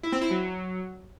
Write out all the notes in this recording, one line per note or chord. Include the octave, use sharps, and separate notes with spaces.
E4
C4
E4
F#3